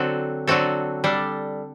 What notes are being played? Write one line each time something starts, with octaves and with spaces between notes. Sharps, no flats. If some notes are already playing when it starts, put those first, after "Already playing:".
Already playing: D3 F#3 C4 F#4 A4
D3 F#3 C4 F#4 A4
G3 D4 A4